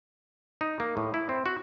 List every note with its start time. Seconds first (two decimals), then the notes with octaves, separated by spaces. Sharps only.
0.61 D#4
0.80 A#3
0.97 A2
1.14 E4
1.29 C4
1.46 F#4